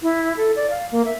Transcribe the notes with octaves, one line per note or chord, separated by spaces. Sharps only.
E4
A4
D5
F5
A#3
E5